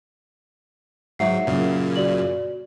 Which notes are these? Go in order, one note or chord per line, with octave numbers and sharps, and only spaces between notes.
G#2 F#3 E5 F#5 C7
F#2 A#2 C#3
F#4 D5 F#7